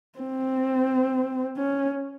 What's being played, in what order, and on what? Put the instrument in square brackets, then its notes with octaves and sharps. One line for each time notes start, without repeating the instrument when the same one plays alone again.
[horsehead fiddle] C4
C#4